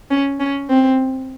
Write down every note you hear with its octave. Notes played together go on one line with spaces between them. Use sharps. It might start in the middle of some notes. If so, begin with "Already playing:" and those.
C#4
C#4
C4